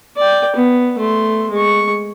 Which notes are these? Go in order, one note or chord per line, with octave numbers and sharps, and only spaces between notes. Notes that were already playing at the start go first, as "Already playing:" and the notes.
D5 G5
B3
A3 C6
G#3 C#6